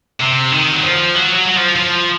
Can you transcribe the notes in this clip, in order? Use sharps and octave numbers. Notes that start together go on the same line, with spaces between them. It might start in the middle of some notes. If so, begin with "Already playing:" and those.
C3
D#3
F#3
F3
F#3
F#3
F#3
F3
F3